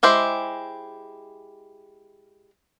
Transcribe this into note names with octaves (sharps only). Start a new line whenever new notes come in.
G#3 E4 G4 C5